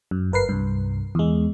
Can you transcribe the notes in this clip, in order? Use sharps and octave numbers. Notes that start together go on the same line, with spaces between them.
F#2
G1 A#4 B4 C7
C2 G2
E2 G#3